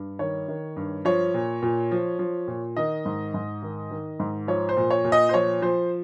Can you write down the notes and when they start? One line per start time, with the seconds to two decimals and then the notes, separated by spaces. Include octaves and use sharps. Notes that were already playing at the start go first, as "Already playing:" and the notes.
Already playing: G2
0.19 D#3 C#5
0.48 D#3
0.76 G2
1.05 F3 C#5
1.34 A#2
1.62 A#2
1.91 F3
2.19 F3
2.48 A#2
2.77 D#3 D#5
3.05 G#2
3.34 G#2
3.62 D#3
3.91 D#3
4.20 G#2
4.48 F3 C#5
4.69 C5
4.77 A#2
4.91 C#5
5.04 A#2
5.12 D#5
5.29 C5
5.34 F3 C#5
5.62 F3 C5